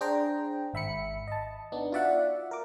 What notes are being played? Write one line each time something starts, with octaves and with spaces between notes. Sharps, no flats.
D4 G#4 C5 G5 A#5
G#1 E5 B5 C#7
D#5 A5
B3 D4 D#4
F4 F#4 D5 E5 F#5
A#4 D6